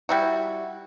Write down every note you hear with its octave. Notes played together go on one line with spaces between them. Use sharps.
G3 E4 F#4